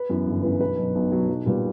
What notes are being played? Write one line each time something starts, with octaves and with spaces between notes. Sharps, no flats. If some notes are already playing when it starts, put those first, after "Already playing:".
Already playing: B4
F#2 E3 B3
G1
F#2 E3 B3
B1 B4
B2 F#3
B1
B2 F#3
B1
A#2 G3 B3